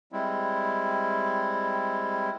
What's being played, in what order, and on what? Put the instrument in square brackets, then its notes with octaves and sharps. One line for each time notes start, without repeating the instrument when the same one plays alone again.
[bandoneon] G3 G#3 C4 E4